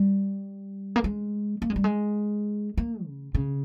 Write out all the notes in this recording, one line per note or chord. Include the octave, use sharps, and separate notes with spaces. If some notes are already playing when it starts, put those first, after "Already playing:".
Already playing: G3
A#3
G#3
A#3
G#3
G3
G#3
A#3
C#3
C#3